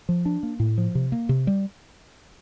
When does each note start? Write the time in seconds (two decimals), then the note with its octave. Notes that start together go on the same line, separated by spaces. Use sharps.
0.09 F3
0.26 D4
0.43 A#3
0.60 A2
0.78 F3
0.95 C3
1.12 A#3
1.29 C3
1.47 G3